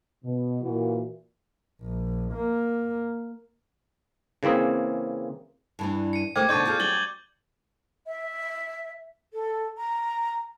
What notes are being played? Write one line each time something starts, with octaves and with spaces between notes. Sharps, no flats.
B2
A#2 E3 F#4
A#1
A#3
C#3 E3 A#3 C4 G#4
G2 E3 D4
C#7 D#7
A3 A#3 G4 C5 G5 D6 G#6
B2 D3 D#4 D5 C#6 G6 A6 D#7
F4 G#4 A4 G6
F#3 C#4 G4 A6 F#7 G7
E5
A4
A#5